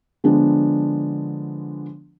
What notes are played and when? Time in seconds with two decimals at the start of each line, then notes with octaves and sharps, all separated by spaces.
0.24 D3 F3 G#3 B3 D4